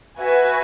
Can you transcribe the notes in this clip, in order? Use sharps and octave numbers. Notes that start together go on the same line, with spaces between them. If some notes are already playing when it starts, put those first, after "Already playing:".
F#4 B4 E5 G#5